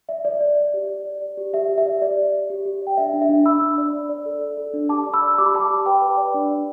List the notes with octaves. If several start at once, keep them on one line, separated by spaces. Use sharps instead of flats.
D5 E5
D5
D5
D5
G4
D5
D5
D5
G4
G4 E5
G4
E5
D5
G4 D5
G4
D5
G4
G4
D5 G5
D4 E5
D4
E5
D4
D4 B5 E6
D4
D5
D4
D5
A4
D5
A4
D4
G4 A5 D6
D5
B5 E6
D5
G4 D6
B5
D5 A5 D6
G4
B4 G5 B5
B4
D5
D4
D5